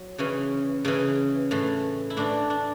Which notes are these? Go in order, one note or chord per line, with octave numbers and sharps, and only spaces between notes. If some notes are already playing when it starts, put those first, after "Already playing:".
Already playing: F#3
C#3 E3 C#4
C#3 E3 C#4
A2 E3
E4
A2 E3 D4
D4